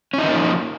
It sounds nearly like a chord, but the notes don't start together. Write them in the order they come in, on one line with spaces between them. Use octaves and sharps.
C#4 D#4 D#3 A#3 F3